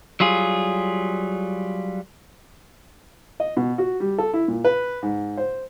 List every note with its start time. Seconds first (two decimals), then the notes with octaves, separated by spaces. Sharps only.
0.20 F#3 G3 F4 G#4
3.40 D#5
3.57 B2
3.78 F#4
4.00 G3
4.18 A4
4.33 E4
4.48 A#2
4.64 B4
5.02 G#2
5.37 C5